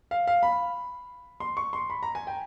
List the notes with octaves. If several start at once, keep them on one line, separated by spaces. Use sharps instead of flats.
F5
F5
B5
C6
C#6
C6
B5
A#5
G#5
G5